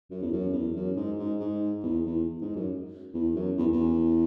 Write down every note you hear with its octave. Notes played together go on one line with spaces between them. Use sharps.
F#2
E2
F#2
E2
F#2
G#2
G#2
G#2
E2
E2
G#2
F#2
E2
F#2
E2
E2